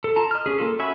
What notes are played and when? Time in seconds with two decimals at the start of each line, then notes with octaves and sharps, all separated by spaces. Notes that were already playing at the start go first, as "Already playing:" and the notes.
0.04 A4
0.16 F4 A5 A#5
0.31 D#5 F6
0.46 C#4 G#4
0.58 A#3 F4 A4
0.79 C#4 F#4 E5 G#5 B5